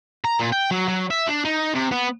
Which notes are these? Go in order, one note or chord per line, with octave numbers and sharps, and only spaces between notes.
A#5
A#2
G5
F#3
F#3
E5
D4
D#4
C3
B3